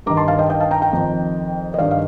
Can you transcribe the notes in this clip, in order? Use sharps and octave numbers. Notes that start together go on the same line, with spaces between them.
G2 D#3 A#5 D6
A5 C6
F5 A5
D#5 G5
D#5 G5
F5 A5
G5 A#5
G5 A#5
F2 D#3
D#5
G2 D#3 D5 F5
F5